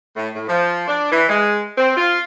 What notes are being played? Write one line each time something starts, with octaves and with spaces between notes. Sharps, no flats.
A2
A2
F3
D4
E3
G#3
C4
F4